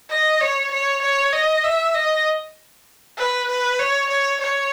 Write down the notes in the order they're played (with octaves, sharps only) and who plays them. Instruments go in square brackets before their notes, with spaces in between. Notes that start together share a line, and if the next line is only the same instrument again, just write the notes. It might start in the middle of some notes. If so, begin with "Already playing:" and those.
[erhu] D#5
C#5
C#5
C#5
D#5
E5
D#5
B4
B4
C#5
C#5
C#5